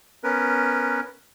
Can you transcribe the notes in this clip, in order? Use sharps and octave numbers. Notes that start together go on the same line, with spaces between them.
B3 C#4 A#4 B4